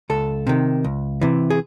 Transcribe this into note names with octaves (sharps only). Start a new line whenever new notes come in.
C#2 A4
C3 D#3
C#2
C3 E3
G#4